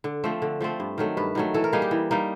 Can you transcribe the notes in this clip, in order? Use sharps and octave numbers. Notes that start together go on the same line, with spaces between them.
D3
F3 A3 C4
D3
F3 A3 C4
G2
D#3 F#3 A3
G2 B4
D#3 F#3 A3
E3 A4
A#4
G3 A#3 D#4 G#4
G4
E3
G3 A#3 D#4